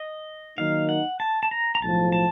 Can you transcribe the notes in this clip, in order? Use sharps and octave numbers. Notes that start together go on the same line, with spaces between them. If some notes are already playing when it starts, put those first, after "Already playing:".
Already playing: D#5
D#3 F#3 A#3 D#4 F5
F#5
A5
A5
A#5
A#5
B1 A2 F3 A5
A5